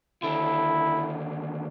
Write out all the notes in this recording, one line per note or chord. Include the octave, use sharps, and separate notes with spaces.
D#2 D3 E4